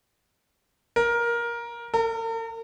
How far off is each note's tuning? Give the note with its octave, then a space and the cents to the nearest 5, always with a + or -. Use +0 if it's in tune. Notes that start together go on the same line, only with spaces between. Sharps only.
A#4 +15
A#4 -45